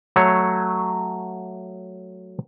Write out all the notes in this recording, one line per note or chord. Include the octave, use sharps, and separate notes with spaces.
F#3 A3 C#5